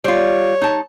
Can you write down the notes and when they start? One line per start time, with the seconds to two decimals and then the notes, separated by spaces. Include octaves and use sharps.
0.04 G3 F4 C#5
0.61 D#4 A5